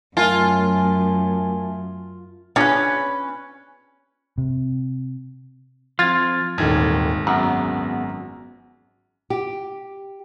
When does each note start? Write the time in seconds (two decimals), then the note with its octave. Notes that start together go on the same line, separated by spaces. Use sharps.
0.17 F#2 A3 F4 A#4 E5 G#5 A5
2.56 C#4 D4 F4 G#4 B4
4.38 C3
5.99 F3 C4 F4 F6 G#6 A6
6.58 D#1 G#1 E2 D#3 A4 G#6
7.27 F#2 B3 G#4 F#5 A#5
9.30 G4